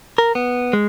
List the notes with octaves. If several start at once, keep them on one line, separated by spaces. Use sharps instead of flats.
A#4
B3
G#3